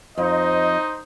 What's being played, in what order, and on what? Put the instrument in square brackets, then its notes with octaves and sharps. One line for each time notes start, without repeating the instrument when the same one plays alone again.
[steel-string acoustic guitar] F2 [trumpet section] D#4 C5 D#5